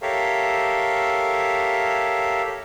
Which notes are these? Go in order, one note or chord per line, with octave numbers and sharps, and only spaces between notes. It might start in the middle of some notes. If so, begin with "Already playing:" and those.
G4 A4 A#4 C#5 E5 F5